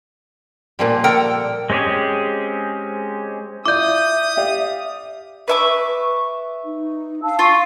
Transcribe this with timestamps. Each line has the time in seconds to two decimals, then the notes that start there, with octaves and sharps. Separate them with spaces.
0.79 A#2 F3 G3
1.04 A4 A#4 G5
1.70 G#3 C4 C#4 G4 G#4
3.66 E4 F4 D5 E5 D6 D#6 G6
4.37 G4 D5 F5
5.48 B4 E5 C#6 D6
6.63 D#4
7.22 F5 A5 E6
7.39 F4 C#6